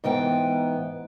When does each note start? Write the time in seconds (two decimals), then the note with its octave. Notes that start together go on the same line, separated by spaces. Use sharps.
0.04 G#2 E3 B3 G5